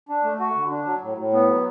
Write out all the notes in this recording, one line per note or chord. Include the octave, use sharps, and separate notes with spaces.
D4
A3
F#4
D3
D4
F#3
A2
A2
B3
F#3